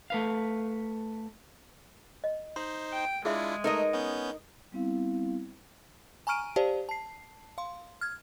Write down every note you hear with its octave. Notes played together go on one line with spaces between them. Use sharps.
A3 B4 F5
D#5
D#4 C5 C6
G5
G#3 D4 E4 F4 G#4 E5 C6
A3 D#4 A#4 B4 D#5
B3 C#4 G6
G3 B3 C4 E4 F5
G#5 A#5 C#6 F6 D7 D#7
G4 C5 D5 F5 A5
A5 C7
F5 C6
F6 G#6